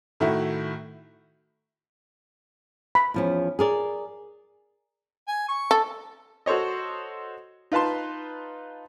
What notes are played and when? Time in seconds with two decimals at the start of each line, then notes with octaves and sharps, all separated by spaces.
0.20 A2 D#3 A3 E4 F#4
2.95 B5
3.14 E2 F3 C#4
3.59 G#4 A#4 D5
5.28 G#5
5.49 C#6
5.71 A4
6.46 F#4 A4 C5 C#5 D#5
7.72 D#4 F4 B4 A5 C6